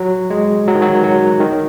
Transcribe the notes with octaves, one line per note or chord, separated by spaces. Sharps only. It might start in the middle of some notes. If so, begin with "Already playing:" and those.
Already playing: F#3
G#3
F#3
D#3
F#3
F#3
D#3